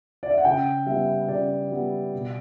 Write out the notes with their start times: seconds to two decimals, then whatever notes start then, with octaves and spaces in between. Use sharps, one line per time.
0.23 D5
0.30 E5
0.38 F#5
0.45 C#3 G5
0.87 G3 B3 E5
1.28 C#3 D5
1.71 G3 B3
2.12 B2